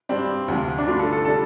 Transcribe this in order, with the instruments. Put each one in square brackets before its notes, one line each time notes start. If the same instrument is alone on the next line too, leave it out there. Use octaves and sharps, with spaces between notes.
[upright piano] G2 G3 D4 [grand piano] C4
[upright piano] D2 C3 F3
[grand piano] D4
[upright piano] G2 D3 A3 [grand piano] F4
[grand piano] A4
A4
[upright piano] D3 G3 D4 [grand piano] A4